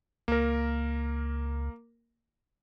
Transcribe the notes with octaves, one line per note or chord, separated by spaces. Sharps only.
C#2 A#3 A#4